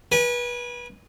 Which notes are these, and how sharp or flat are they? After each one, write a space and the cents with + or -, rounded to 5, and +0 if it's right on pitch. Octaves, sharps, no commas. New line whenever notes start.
B4 -30 G#5 -10